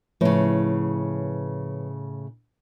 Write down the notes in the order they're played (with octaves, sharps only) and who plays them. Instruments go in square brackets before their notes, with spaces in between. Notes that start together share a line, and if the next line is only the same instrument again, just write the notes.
[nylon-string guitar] A2 C#3 [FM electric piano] F3 B4 C#5